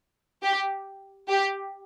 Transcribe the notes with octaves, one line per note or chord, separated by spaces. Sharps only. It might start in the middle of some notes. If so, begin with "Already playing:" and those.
G4
G4